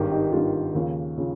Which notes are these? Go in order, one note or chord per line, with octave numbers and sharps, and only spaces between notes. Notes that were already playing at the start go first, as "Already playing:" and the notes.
Already playing: G#1 G2 D#3 G4 A#4
D#4 G4
G#1 G2 D#3 F4
D#2 C#3 F3
C#3 F3